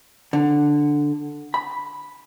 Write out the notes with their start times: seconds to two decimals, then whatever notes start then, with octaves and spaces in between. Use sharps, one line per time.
0.33 D3
1.54 B5